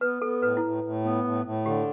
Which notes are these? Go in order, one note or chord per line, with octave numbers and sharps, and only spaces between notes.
B3 B4
B3 A4
A2 B4
E4
A2
A2
B3
A2
A2
D3 G4